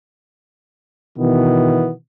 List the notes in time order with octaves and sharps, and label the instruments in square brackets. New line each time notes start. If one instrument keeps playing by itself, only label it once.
[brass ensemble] B2 D#3 E3 B3